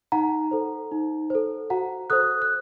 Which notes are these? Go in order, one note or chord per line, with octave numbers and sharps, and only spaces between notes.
D#4 F#5 A#5
A4 C5
D#4
A4 C5
F#4 F#5 A#5
A4 C5 D#6 F#6
F#6